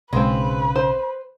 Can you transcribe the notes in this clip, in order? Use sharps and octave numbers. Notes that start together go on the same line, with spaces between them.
B1 C#3 G#3 C4 B4
C5